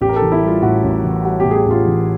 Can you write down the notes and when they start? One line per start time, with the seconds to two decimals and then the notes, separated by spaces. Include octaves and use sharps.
0.01 A1 G4
0.09 A#4
0.16 A4
0.22 E3
0.32 E4
0.42 G3
0.48 F4
0.62 A2 F#4
0.83 A1
1.04 E3
1.25 G3 F#4
1.40 A2 G4
1.51 G#4
1.56 G4
1.66 A1 F4
1.86 E3